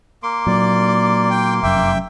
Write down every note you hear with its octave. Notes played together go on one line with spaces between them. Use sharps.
A#3 C6 D6
A#2 F#3 D5
G5
F1 F#2 E5 G5